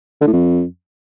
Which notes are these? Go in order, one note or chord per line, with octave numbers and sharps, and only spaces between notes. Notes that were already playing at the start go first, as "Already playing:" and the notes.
D3
A2
F2